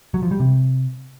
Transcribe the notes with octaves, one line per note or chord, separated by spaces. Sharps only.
F#3
F3
G3
C3